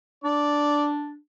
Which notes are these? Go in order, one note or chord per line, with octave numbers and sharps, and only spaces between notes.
D4 D5